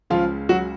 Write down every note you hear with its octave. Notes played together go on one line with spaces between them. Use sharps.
C#2 C#3 F3 F4
F#3 F#4